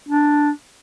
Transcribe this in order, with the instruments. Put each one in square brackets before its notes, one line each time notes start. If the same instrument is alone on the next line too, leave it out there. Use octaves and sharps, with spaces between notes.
[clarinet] D4